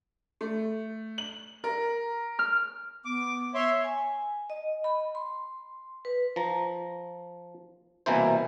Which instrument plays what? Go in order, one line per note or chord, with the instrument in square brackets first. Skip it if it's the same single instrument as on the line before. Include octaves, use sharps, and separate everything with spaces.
[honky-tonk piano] A3
F#7
A#4
[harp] F6
[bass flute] B3 [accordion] D6
[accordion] C#5 E5 C6
[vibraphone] G#5
D#5
B5
C6
B4
[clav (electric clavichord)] F3 A#5
C2 B2 E3 A#3 E4 C5